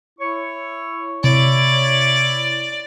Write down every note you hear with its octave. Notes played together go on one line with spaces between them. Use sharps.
E4 C#5 C#6
C3 E4 C#5 D5